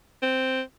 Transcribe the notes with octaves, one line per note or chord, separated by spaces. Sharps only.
C4